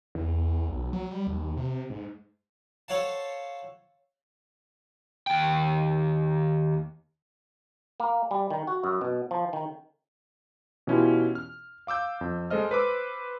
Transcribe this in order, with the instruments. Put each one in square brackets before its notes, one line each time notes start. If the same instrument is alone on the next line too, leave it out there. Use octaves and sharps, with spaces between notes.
[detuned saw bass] E2
E2
B1
F#3
G3
D#2
C3
G#2
[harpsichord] A4 C5 C#5 F5 F#5 A5
[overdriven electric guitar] D#2 G5
[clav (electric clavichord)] A#3
G3
D#3
F#4
F#2
B2
F3
D#3
[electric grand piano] B2 E3 C#4 E4 F4 G4
F6
F5 D6 E6 G6
F2
G#3 A4 C5 D#5 F6
B4 C5 B5 D6 E6